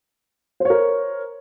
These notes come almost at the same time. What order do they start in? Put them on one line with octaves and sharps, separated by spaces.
C5 C#5 A#4